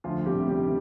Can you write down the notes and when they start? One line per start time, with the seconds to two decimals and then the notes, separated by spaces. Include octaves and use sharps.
0.04 D2 F3 F4
0.26 G3 G4
0.34 C3
0.48 G3 G4
0.63 D#3